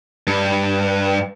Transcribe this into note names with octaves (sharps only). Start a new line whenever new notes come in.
G2